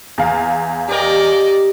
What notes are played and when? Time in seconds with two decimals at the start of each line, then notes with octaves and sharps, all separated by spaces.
0.18 E2 F5
0.88 G4 A#4 D5 D#5